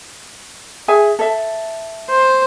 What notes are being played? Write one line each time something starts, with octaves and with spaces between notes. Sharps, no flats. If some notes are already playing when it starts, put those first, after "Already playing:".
G#4 E5 G#5
A4 E5
C5